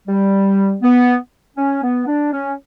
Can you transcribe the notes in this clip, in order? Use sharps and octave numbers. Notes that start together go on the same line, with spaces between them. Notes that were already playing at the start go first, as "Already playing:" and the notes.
G3
B3
C#4
B3
D4
C#4